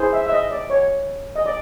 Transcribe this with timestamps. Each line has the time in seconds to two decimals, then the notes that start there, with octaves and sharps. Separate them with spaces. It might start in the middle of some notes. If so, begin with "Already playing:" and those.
Already playing: E4 G#4 C5
0.13 E5
0.26 E5
0.32 D#5
0.51 D5
0.70 C#5
1.36 D#5
1.46 D5